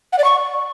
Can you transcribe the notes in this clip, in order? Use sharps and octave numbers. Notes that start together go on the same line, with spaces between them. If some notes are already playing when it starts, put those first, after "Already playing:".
F#5
D5
C#6